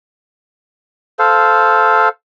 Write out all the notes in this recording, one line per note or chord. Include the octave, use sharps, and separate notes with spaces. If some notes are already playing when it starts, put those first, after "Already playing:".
A4 C5 F5